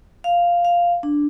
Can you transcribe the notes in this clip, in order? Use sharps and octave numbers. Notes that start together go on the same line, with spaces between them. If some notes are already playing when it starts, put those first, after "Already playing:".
F5
F5
D4